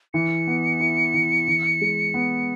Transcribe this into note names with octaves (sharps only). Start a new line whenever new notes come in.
E3 C#7
B3
E4
E3
E3
G#3
B3